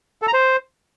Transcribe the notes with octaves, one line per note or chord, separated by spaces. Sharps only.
A4
A#5
C5